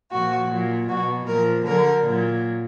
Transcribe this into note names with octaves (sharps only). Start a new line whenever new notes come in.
A#2 F3 F#4
A#2 F#3
B2 F#3 F#4
A#2 F3 A#4
D3 F#3 A#4
A#2 F#3